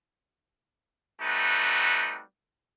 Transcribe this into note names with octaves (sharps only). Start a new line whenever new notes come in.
G3 A3 C4 D#4 F#4 B4